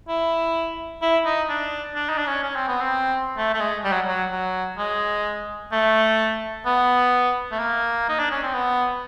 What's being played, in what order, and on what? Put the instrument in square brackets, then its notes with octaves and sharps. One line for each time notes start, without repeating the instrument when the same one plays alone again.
[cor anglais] E4
E4
D#4
D4
D4
D#4
D4
C#4
C#4
C4
B3
C4
A3
A3
G#3
G3
F#3
F#3
F#3
G#3
A3
B3
A3
A#3
D#4
D4
C#4
C4
B3